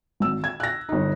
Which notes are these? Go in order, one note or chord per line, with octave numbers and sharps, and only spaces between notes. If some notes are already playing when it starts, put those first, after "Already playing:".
G#1 E6
G#6
F#6 A#6
G1 D#4